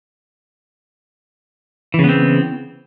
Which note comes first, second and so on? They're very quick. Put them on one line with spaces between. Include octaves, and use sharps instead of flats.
E3 C#3 B3 C4